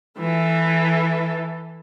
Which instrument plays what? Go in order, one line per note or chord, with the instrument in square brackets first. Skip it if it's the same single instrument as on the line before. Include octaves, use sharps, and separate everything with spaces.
[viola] E3 A4